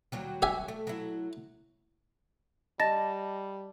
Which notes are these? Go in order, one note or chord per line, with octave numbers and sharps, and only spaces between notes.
D#2 F#3 G3
G4 E5 G#5
A3
F#3 E4
G3 D#5 A5 A6 A#6